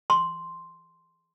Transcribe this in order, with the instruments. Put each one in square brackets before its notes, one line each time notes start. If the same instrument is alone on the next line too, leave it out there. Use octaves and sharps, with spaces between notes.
[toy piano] C6